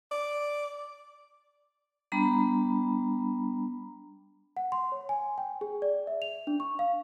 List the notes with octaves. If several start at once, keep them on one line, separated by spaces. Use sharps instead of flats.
D5
G3 B3 D4 A#5 B5
F#5
C6
C#5
G#5
G5
G#4
D5
E5
F7
D4
C#6
F5